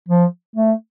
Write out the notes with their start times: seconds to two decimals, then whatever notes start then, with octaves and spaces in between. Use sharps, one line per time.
0.09 F3
0.56 A3